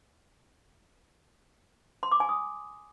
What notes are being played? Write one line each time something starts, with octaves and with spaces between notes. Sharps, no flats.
C6
D6
G#5
D#6